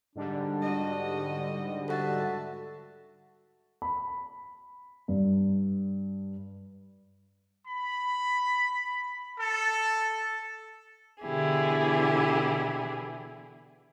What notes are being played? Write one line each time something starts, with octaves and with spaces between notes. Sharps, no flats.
G#2 D3 G3 D4
F#4 D#5
F#4 A4 E5 F#5 A5
B5
G2
B5
A4
B2 D3 E3 E4 G4 G#4